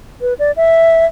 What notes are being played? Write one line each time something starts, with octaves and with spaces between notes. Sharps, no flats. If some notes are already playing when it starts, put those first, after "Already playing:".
B4
D5
E5